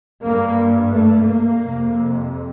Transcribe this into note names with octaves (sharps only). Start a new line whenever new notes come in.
G2 A#3
A3
A#3
F2 C3